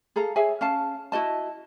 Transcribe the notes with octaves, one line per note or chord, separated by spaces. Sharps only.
G#4 A4 F5 A#5
G#4 C#5 E5 G#5
C#4 F5 A5
E4 F#4 D#5 A5